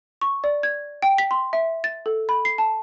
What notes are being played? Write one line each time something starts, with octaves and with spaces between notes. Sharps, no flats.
C#6
D5
G#6
G5
B6
C6
E5
A6
A4
B5
C7
A5